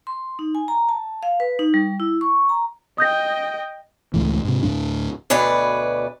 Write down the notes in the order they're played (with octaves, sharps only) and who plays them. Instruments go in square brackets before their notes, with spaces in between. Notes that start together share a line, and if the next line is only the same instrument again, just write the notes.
[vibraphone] C6
D#4
G#5
A#5
A5
F5
B4
D#4
G3
E4
C#6
A#5
[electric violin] D#5 G5 [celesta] D#6 G6 A#6
[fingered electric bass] C#2 A2 E3
G#2 C3
D2 A2 G#3 D4
[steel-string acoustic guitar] D2 B2 B4 C#5 D5